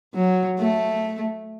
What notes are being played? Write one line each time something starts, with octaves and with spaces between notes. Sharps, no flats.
F#3
A3